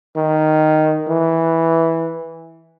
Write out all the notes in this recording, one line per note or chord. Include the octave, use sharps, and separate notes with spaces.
D#3
E3